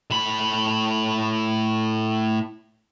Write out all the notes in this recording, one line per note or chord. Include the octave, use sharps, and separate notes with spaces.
A2 B5